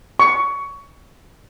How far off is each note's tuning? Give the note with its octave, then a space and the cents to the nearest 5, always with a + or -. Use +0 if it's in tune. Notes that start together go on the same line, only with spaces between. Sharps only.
C#6 +15